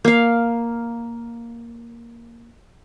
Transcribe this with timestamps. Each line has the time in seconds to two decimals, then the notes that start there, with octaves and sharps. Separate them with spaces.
0.05 A#3 F5